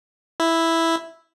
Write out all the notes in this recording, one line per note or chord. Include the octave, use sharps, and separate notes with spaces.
E4